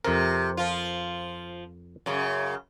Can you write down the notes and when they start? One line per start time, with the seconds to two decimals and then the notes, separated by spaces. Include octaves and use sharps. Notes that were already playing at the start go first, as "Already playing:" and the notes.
0.05 F2 C3 A#4
0.57 F3 F4
2.06 F#2 C#3